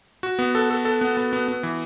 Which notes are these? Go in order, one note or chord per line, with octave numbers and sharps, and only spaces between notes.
F#4
B3
A4
A4
A4
B3
B3
B3
B3
E3